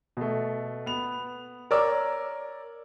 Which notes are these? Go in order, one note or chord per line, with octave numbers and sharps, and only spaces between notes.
B2 A3
B3 F7
A#4 C#5 D5 D6 E6